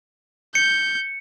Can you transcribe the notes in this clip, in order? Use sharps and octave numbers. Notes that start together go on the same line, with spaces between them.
G6 C#7